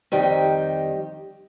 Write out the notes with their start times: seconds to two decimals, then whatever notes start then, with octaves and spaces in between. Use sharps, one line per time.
0.12 F2 D#3 G3 D#4 G4